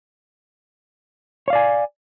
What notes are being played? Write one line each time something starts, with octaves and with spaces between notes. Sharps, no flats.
C#5 D5 F5 G#5